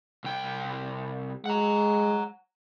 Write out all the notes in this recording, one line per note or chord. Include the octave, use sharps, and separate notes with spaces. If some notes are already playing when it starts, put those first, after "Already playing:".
C2 G5
G#3 F#5 A#5